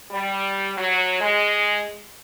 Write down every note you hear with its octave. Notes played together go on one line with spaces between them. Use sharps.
G3
F#3
G#3